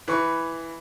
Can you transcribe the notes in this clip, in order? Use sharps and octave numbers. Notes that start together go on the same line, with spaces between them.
E3 B4 C#6